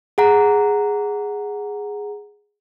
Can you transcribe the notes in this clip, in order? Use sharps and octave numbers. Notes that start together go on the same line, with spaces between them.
G#4 F#5 A#5